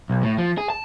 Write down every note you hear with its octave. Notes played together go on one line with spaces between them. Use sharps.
B1
A2
F3
G#4
A5